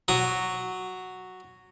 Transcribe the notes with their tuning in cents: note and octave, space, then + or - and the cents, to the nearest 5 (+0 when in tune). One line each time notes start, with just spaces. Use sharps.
F#3 +0 D#6 +0